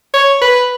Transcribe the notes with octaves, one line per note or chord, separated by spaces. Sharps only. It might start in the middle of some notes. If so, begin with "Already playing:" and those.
C#5
B4